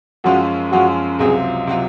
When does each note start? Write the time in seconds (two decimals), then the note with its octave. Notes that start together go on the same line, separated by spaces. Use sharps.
0.24 F#2 F3 G#3 C#4 F4 F#4
0.72 F#2 F3 G#3 C#4 F4 F#4
1.19 C#2 C3 F#3 C4 F4 G#4
1.67 C3 F#3 C4 F4